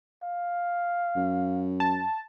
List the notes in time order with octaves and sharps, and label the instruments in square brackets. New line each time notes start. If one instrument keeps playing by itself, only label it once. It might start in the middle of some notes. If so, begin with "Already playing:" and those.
[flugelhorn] F5
[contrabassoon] F#2
[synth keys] A5